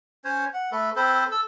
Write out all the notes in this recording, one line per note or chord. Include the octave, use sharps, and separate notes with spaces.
C#4 C5 C#5
F#5
A3 A4 B4
C4 A4 B4 C5
A4 E6